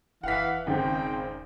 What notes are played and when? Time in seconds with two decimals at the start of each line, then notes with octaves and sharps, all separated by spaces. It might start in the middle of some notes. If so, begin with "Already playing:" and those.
0.23 E1 E3 F5 F#5 B6
0.67 G#1 C#3 C4 D#4 G5